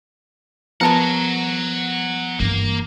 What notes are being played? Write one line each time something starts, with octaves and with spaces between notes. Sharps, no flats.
F3 G#3 B3 A4 A#4 F#5 A#5
G2 E3 A#3